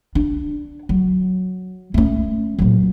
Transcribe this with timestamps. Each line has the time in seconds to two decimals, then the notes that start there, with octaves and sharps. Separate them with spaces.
0.15 D4
0.89 F#3
1.94 A3 C#4
2.59 A#2 F#3